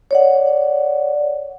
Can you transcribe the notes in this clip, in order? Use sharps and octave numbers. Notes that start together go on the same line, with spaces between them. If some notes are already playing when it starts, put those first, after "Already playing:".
C#5 D5 F#5